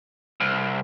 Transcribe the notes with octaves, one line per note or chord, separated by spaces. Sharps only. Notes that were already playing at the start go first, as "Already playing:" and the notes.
C2